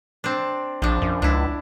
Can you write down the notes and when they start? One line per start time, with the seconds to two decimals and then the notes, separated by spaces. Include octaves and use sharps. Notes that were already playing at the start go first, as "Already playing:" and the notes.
0.24 C4 D4
0.82 A#1 F3 D4
1.02 F#2
1.22 C#2 D4 E4